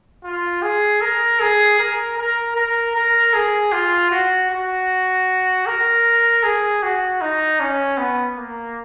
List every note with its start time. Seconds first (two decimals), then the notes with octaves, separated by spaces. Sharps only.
0.24 F4
0.62 G#4
1.01 A#4
1.40 G#4
1.79 A#4
2.18 A#4
2.56 A#4
2.96 A#4
3.33 G#4
3.72 F4
4.11 F#4
4.51 F#4
5.66 A#4
6.44 G#4
6.83 F#4
7.21 D#4
7.60 C#4
7.98 B3
8.37 A#3